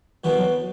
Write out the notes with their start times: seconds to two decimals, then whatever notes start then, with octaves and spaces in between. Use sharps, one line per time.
0.24 C2 B2 E3 G3 B3 F#4
0.37 F#3